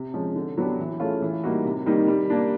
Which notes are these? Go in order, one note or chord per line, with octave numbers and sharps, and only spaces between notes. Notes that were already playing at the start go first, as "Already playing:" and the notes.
Already playing: C3
F3 G#3 C#4
D3
F#3 B3 D4 G4
E3
A3 C#4 F4 G#4
E3
G3 A#3 D#4 F#4
C3
D#3 G3 A#3 D#4
G3
A#3 D4